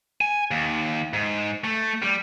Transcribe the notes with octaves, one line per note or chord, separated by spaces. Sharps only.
G#5
D#2
G#2
A3
G3